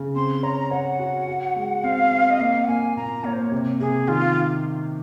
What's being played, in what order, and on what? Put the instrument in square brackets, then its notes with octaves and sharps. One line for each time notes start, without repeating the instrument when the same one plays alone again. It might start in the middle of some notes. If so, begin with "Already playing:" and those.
Already playing: [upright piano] C#3
[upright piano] C4 [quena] C6
[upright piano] C#5 [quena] A#5
[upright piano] C#5 [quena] F#5
[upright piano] F#4
F#4
G#3
[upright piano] C4 [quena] F5
[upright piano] C4
[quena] D#5
[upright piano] A#3 [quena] F5
[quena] F#5
[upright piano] A#3 [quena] G#5
[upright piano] A#2 [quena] A#5
[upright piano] A#3 [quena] C#5
[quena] C5
C#5
[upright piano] C3
[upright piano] C3 [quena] G#4
[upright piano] D#3 [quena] F4